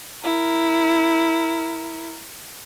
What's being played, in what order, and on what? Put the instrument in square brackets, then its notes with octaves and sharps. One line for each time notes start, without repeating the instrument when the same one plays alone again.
[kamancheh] E4 A#4